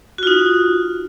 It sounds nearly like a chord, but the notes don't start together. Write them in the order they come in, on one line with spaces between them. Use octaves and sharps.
F#4 F4 D#4